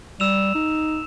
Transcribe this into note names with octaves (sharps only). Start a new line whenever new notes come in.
G3 E6 E7 F7
D#4